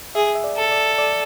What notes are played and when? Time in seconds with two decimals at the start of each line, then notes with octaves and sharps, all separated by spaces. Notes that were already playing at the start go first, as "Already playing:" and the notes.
0.15 G#4 E5
0.35 E5
0.44 D5
0.57 A4
0.71 D5
0.98 D5